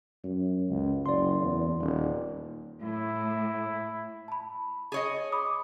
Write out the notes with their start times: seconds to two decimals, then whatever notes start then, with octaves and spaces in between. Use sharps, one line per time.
0.24 F#2
0.69 C#2
1.06 F#1 D5 C6
1.43 E2
1.80 D#1
2.83 A2 E4
4.28 A5 B5
4.92 G#4 C#5 D#5
5.32 B5 D6 D#6